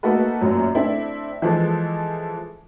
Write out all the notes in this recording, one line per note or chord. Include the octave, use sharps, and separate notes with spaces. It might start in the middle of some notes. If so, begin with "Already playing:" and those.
A3 A#3 D#4 F#4 A4 B4
F#2 A#2 F#3
A3 C4 D4 E4
E3 F3 G#3 A4